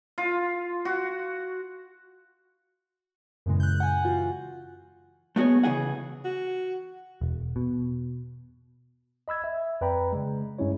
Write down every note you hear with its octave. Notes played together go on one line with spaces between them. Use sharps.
F4
F#4
F#2 A#2 C#3 E3 G#3
F#6 G6
F#5 G#5
E3 F4 F#4
A3 B3 F#4 G#4 C#5
C#3 E3 G#4 F#5
F#4
E1
B2
D#5 B5 E6 G#6
E5
F2 B4 D5 G5 A#5 B5
C#3 G#3
G2 G#3 C#4 E4 C#5